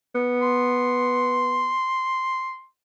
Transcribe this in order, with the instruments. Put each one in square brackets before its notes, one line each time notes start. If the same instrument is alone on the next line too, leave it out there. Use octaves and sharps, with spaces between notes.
[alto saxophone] B3
[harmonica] C6